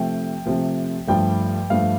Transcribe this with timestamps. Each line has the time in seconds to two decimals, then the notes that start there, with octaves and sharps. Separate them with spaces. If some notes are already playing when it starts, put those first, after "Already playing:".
Already playing: C3 F3 A3 G5
0.46 C3 F3 A3
1.07 G2 F3 A3 G5
1.70 G2 F3 A3 F5